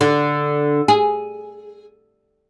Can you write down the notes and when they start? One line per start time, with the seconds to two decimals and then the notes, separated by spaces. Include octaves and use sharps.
0.01 D3
0.88 G#4